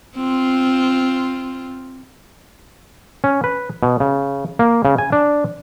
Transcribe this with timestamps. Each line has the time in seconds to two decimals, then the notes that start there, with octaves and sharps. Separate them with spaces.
0.16 C4 F4
3.24 C#4
3.44 B4
3.83 B2
4.00 C#3
4.59 A#3
4.85 C#3
4.98 G#5
5.12 D4